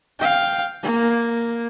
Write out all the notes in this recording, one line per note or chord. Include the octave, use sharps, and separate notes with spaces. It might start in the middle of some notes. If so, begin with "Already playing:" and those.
F5 G5
A#3